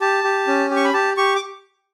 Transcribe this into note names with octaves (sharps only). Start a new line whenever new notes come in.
G4 A5
G4
C#4
G4
C#6
B5
G4 A5
G4 C#6
D6